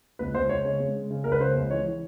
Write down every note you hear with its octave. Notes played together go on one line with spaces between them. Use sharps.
C#2 B4
C#2 C5
C#2 C#5
C#3 C#5
G#3
C#3
C#3
C#2 A#4
B4
C#3 C5
C#2
E3 C#5
E3